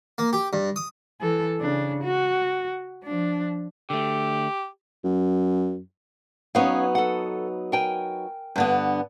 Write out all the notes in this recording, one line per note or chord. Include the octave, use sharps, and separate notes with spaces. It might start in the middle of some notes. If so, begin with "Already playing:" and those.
A#3
G4
G2
D#6
E3 A4
C#3 D4
F#4
F3 D4
D3 A3 G4
F#2
F#3 B3 C#4 D#4 C#5 F5
A4 F#5
A#4 G5 G#5
G2 D3 B3